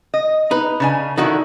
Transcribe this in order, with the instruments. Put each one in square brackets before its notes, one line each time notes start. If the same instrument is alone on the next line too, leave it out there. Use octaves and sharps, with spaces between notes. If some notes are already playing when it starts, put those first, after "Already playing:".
[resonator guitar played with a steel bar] D#5
[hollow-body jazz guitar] D#4 B4
[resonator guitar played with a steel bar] C#3 D4 G#5
[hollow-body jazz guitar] D3 D#3 F#4 [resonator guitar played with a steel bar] D#4 E4